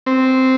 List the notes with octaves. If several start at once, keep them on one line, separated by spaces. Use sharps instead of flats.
C4